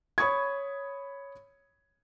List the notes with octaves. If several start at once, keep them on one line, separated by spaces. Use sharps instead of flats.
C#5 B5 C#6 D#6 G#6